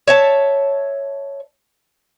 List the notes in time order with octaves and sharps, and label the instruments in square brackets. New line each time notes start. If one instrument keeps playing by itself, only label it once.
[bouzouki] C#5 E5 A5